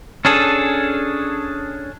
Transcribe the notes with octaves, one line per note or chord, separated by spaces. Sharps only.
C#4 D4 G#4 A4